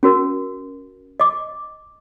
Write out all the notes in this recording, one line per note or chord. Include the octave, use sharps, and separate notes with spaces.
C#4 F#4 A#4
D#5 D6